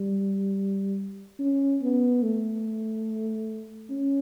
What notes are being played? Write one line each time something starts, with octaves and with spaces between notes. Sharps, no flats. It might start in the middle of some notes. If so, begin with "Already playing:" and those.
Already playing: G3
C#4
B3
A3
C#4